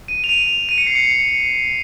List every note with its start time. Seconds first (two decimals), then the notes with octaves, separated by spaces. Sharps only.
0.08 D#7
0.24 F7
0.29 D#7
0.35 F7
0.46 F7
0.69 D#7
0.78 C#7
0.87 C7
0.95 C#7